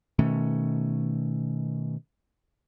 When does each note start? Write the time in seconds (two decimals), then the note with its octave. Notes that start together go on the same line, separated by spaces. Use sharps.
0.19 B2 D#3 A3 C#4